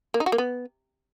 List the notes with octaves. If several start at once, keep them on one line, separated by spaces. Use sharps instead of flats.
A#3
D#4
F#4
A#3
B3